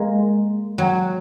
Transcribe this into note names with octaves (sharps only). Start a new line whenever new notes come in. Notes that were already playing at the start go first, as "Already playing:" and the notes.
Already playing: G#3 A#3
F#3